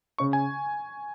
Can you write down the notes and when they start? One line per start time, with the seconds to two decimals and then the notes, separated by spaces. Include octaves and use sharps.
0.18 C#3 C#6
0.33 G#5